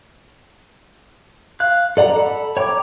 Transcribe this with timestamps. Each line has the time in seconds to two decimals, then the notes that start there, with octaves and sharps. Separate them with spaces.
1.60 F5 F#6
1.97 A4 D5 F#5 A#5
2.16 A4 B5
2.57 C#5 G5 A#5 D6